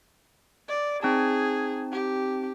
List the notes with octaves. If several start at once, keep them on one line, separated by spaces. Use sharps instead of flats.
D5
C4 D#4 G#4 A5
G4